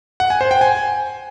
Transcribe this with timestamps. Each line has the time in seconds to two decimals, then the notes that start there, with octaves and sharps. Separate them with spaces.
0.20 F#5
0.30 G#5
0.41 C5
0.51 G5
0.61 G#5